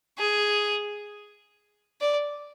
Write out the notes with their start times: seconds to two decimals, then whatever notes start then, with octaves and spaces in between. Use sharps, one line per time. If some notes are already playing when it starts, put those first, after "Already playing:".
0.18 G#4
2.01 D5